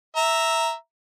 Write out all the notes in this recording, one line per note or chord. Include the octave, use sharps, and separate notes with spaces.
E5 A#5